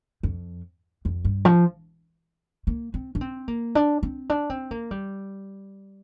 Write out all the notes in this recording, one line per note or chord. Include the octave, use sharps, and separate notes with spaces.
F2
F2
G2
F3
A#3
C4
D4
C4
A#3
D4
C4
D4
C4
A#3
G3